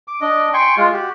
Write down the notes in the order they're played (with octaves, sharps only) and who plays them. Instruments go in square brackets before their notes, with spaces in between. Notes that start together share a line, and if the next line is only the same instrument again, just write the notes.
[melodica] D6
D4 D#5
G5 G#5 C6 C#6
G#3 F4
F#4 G4